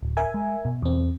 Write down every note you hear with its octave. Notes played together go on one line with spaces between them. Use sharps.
D1
A#4 E5 G#5
G#3
B2
E2 C4